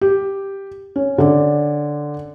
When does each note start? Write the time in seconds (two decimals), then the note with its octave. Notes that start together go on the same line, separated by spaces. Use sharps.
0.01 G4
0.96 C#4
1.18 D3 C#4 D5